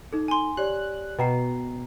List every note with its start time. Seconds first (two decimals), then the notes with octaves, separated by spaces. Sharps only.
0.13 D#4 A4
0.28 G#5 C6
0.57 G4 C#5 D5 F#6
1.19 B2 G5 A#5 C7